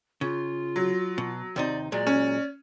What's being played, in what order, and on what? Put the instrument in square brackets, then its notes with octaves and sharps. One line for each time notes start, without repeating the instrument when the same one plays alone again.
[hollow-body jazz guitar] C#3 [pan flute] F4
[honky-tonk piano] F#3
[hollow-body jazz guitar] B2
[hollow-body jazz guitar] D#2 C3 D#4 [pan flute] D5
[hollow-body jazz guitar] A#2 F#3 G#3 [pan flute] D5
[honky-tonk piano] C#4